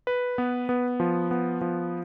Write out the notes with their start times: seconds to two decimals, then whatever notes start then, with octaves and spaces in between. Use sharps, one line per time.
0.07 B4
0.38 B3
0.69 B3
1.00 F3
1.31 B3
1.61 F3